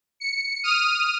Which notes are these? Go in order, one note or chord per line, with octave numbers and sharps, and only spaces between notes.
C#7
D#6 F6 D#7